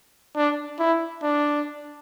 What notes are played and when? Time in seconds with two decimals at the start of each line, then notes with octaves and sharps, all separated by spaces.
0.36 D4
0.79 E4
1.23 D4